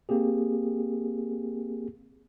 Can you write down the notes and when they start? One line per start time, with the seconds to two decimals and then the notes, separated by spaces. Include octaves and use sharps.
0.09 A#3 C4 G4 G#4